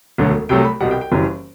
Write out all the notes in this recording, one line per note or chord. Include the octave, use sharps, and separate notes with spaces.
E1 D2 D3 F#3 A3
C2 C3 F#3 A3 G5
B5
C2 B2 G3 F#5
G5
G5
F#1 F#2 E3 G3